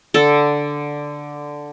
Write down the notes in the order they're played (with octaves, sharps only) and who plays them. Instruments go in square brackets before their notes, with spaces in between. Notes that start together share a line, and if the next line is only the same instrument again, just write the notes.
[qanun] D3 A4